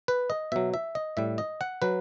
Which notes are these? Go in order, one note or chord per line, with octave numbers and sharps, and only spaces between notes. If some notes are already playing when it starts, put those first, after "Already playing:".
B4
D#5
B2 F#3 E5
E5
D#5
A2 G3 E5
D#5
F#5
F#3 B4